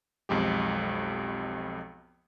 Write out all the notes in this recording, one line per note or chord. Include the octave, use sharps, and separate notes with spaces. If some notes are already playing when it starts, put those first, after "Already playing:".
B1 F2 G#3 G4